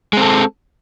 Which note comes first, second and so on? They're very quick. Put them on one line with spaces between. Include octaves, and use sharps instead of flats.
G#3 C4 A4